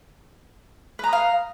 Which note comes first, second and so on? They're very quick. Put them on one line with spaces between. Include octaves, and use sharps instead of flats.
B4 A#5 D#6 F5